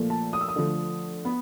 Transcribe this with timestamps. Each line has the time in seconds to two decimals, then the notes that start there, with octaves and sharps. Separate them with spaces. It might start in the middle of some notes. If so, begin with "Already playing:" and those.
Already playing: A#2 F3 A3
0.10 A5
0.33 D#6
0.41 E6
0.48 D#6
0.56 D3 F3 A3
1.25 B3